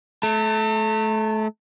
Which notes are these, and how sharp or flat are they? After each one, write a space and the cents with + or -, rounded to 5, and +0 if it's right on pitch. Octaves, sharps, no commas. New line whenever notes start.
A3 -25 A5 +40